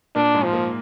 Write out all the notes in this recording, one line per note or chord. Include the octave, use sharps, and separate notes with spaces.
A#2 A#3 D4
G#2 G#3
F3
A#2 A#3